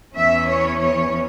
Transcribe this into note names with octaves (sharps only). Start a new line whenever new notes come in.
E2 E3 C#4 E5
C#5
C#5